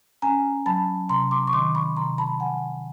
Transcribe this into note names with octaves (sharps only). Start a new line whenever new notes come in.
C#4 G#5 A#5
F#3 A5 B5
C3 A#5 C6
C6 D6
C#6
D#3 C6 D6
B5 C#6
C3 A#5 C6
A5 B5
F3 F#5 G#5